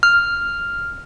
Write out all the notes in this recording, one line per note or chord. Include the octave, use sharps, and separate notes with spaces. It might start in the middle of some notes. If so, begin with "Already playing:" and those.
F6